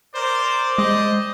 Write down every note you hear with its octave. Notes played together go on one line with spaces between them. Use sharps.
A#4 C5 D5
G#3 G4 C5 D#5